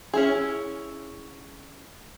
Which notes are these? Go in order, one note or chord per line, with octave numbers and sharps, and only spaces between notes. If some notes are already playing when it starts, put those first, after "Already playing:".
C#4 E4 G#4